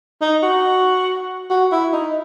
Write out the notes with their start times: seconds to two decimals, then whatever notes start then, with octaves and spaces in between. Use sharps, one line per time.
0.21 D#4
0.43 F#4
1.50 F#4
1.72 E4
1.93 D#4